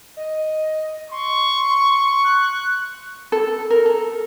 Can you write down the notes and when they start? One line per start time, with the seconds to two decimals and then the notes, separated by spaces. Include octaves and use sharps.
0.17 D#5
1.11 C6 C#6
2.24 F#6
3.32 A4
3.70 A#4
3.86 A4